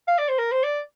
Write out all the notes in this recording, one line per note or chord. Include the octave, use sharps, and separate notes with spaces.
F5
D5
C5
A#4
C5
D5